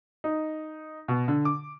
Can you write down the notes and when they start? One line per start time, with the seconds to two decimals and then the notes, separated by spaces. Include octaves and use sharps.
0.24 D#4
1.08 B2
1.28 D3
1.45 D6